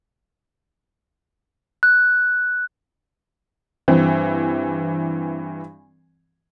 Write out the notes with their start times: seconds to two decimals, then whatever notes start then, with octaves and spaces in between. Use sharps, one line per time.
1.83 F#6
3.88 G2 E3 C4